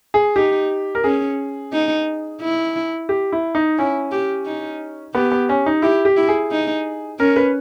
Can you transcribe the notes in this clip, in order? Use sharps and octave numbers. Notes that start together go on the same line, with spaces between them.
G#4
D#4 G4
A#4
C#4 G#4
D#4
E4
G4
E4
D#4
C#4 E4
G4
D#4
B3 G4
B3
C#4
D#4
E4 G4
G4
E4
G#4
D#4
C#4 A#4
B4